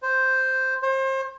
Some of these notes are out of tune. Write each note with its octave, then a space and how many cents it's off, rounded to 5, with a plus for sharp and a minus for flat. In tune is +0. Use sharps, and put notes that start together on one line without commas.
C5 +0
C5 +35